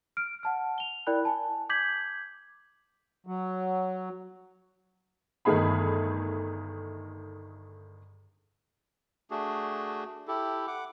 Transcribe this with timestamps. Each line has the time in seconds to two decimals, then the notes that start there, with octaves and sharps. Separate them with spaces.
0.17 F6 D7
0.43 F#5 A5 F6
0.78 F7 G7
1.07 E4 A#4 D5 G5 B5 F#6
1.25 G#5 A5
1.69 D6 G6 G#6 B6 F#7
3.27 F#3
5.45 G1 D#3 A3 G#4 B5
9.31 A3 D4 F#4 G#4
10.28 E4 G4 A4
10.67 F#5 D6